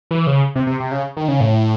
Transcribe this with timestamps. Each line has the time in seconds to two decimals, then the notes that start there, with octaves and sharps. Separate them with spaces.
0.11 E3
0.27 C#3
0.55 C3
0.67 C3
0.80 C3
0.92 C#3
1.17 D#3
1.28 C#3
1.41 A2